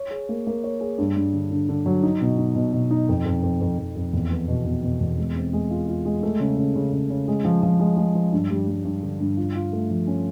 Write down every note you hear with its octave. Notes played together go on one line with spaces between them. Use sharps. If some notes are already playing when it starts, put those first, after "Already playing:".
Already playing: C#5
G#4
A#3
A#3
C#5
G#4
G2
G2
D3
D3
D3
F#3
D#4
B2
D#4
B2
B2
D#4
F2
F2
F2
F2
F2
F2
E2
B3
B2
B2
B2
E2
G#3
C4
G#3
F4
F4
G#3
A3
C#3
C#3
C#3
C#3
C#3
G#3
F3
F3
G#3
G#3
F3
G2
G3
G3
G2
D3
G2
F4
F4
A3
F3
C#4